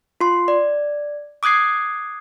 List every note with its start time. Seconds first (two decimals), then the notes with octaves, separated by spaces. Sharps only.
0.21 F4 C6
0.48 D5
1.43 D6 D#6 F#6 G#6 C7